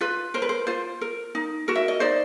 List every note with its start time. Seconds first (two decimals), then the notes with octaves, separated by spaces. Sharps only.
0.01 F4 B4
0.34 A#4 C5
0.42 B4
0.49 C5
0.67 F4 C5
1.01 A#4
1.35 D#4
1.68 F#4 A#4
1.75 E5
1.88 D#5
2.00 D#4 C5 D5